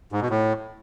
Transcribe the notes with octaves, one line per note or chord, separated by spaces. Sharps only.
G#2
B2
A2